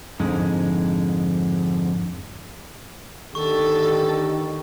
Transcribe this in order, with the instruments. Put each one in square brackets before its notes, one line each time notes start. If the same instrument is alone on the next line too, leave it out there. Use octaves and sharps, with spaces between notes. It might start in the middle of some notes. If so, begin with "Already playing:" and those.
[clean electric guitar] F2 G#2 D3 G#3
[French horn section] D#2 D3 G4 [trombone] D#3 [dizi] A4 [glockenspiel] C#6